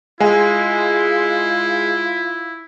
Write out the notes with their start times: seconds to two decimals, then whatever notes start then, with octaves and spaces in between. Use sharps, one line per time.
0.20 G#3 E4 F4 G#5